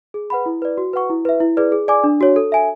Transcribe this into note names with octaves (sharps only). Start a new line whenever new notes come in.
G#4
B4 F#5 B5
E4
B4 D5
F#4
B4 F#5 C#6
E4
B4 E5
E4
G#4 B4 D5
G#4
D5 G#5 D6
D4
F#4 C#5
A4
E5 G#5